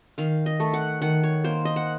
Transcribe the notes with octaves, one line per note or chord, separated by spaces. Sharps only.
D#3 F5
D#5
A3
F#5
D#3 F#5
C#5
A#3 C5
D#5
F#5